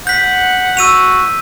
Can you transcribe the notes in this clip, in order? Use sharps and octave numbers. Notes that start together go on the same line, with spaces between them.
F#5 G6 B6
F#4 E6 D#7 F7